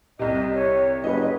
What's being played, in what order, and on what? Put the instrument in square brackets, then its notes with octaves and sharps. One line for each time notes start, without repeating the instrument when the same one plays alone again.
[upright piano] C2 C3 [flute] D#5
[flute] C#5
[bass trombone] F#1 [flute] B4 [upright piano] D#5